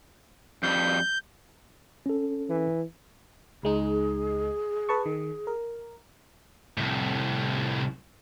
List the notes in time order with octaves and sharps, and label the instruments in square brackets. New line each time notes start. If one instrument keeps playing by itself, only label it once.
[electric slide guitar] F2 G3 [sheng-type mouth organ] G6
[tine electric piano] C#4 A4
[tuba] E3
[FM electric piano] C#2 G#3 D#4 [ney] G#4
[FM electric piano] B4 A5 C#6
D#3
A#4
[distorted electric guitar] C2 A2